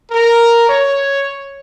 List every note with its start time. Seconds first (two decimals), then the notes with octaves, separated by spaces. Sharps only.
0.11 A#4
0.67 C#5